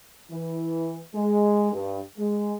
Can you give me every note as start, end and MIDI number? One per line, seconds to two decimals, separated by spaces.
0.31 1.00 52
1.14 1.68 56
1.73 2.00 43
2.18 2.54 56